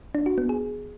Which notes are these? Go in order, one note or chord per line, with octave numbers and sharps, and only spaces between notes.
D4
F#4
B3
G#4